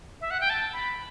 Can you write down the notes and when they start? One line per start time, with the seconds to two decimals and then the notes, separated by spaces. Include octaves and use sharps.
0.21 E5
0.31 F#5
0.41 G5
0.50 A5
0.73 B5